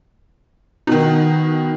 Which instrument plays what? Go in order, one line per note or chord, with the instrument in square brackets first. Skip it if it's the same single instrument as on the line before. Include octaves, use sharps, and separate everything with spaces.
[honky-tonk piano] B2 D#3 [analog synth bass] D#4